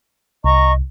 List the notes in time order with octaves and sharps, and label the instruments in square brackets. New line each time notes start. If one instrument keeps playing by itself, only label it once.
[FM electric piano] C2 [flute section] D#5 A#5 C#6